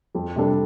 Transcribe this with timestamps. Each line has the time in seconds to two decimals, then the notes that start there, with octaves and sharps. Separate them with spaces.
0.15 F2
0.36 C3 G3 D4 A4